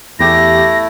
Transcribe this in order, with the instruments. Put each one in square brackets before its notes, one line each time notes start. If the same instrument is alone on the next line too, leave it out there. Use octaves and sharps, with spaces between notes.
[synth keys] E2 G4 [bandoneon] A3 E4 [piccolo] A#6